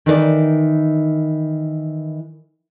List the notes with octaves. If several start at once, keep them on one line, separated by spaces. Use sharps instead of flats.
D#3 E3 D#4 A#4 B4 D5